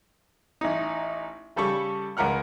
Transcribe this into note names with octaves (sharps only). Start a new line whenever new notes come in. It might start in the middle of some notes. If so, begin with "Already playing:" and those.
A1 D#4
C#3 G3 A4 B5 C#6
C#2 C#3 A#4 F#5 F6